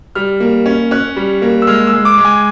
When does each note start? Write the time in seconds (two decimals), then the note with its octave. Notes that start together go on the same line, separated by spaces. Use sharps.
0.15 G3 F6
0.40 A#3
0.66 C#4
0.91 C#4 F#6
1.16 G3
1.42 A#3
1.62 E6
1.67 G#3 F6
1.87 E6
1.94 G#3
2.05 D6
2.18 G#3
2.25 G#5